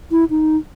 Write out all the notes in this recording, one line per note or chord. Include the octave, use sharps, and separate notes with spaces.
E4
D#4